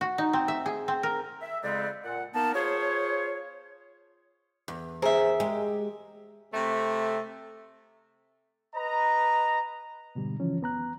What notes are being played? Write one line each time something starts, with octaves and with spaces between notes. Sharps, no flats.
F#4
D#4
C4
E5
G#4
C4
A#4
E5
F2 C#3 G#3 B3 C4 D5
A#2 F#5
A#3 B3 D#4 A#4 A5
F4 G#4 C5 C#5
E2
G#4 A#4 C5 E5
G#3 G4
C3 A3
B4 D#5 A#5
G#2 B2 D3 G3
C#3 E3 F3 C#4
D#2 B3 A#5 F#6